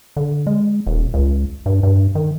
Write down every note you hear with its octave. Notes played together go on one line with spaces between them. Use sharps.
D3
G#3
D#1
C#2
G2
G2
D#3